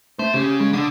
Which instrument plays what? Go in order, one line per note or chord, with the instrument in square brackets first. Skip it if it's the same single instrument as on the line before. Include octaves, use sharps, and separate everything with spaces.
[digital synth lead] A3 [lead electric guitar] C5
[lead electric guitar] C#3 [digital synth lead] G4
[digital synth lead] G#3
[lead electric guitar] D3 [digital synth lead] D#6